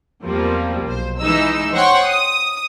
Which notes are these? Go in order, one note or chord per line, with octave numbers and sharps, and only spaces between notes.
E2 F3 G3 A#3 C4
B1 C5
E3 G#3 D#4 E6
C5 C#5 F#5 G5 C6 C#6
D#6